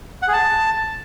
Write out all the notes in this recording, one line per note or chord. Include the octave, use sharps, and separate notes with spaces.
F#5
G#4
A5